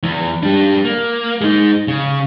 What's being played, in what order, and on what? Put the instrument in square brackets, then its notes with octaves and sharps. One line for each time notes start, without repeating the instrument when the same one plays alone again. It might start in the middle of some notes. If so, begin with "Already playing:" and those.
[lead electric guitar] E2
G3 D4
A#3
G#3 D#4
C#3